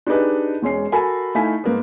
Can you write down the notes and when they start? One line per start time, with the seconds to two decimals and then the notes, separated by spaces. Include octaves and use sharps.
0.07 D4 D#4 G4 G#4 B4 D#5
0.62 E1 G#3 C#4 C7
0.92 F#4 A4 A#4 G#5 B5
1.35 A3 D#4 E4 F5 G#5 B6
1.64 G#2 A#3 B3